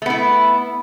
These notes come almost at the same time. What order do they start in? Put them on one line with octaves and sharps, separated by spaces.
A3 B3 E4